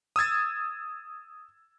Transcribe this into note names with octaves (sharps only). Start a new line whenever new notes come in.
D#6 E6 G#6 A6